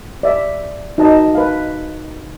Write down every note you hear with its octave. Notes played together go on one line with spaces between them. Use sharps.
D5 E5
D#4 F#4 D#5 A5
B4 F5